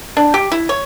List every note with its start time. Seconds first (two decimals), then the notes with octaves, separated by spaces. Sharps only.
0.17 D4
0.34 G4
0.52 E4
0.69 C#5